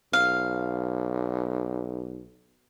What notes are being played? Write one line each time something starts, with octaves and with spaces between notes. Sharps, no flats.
B1 F5